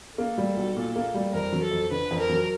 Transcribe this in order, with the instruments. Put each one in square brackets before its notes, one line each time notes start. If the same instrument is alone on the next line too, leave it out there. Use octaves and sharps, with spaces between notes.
[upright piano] A#3 [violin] A4
[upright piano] G3
B1
A#2
A#3
G3
[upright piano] F2 [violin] A#4
[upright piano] F#3
[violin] A4
[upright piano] F2
[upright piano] D3 [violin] B4
[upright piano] F2
[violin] A#4
[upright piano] F#3